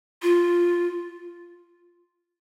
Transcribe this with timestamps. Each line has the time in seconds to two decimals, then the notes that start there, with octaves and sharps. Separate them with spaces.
0.22 F4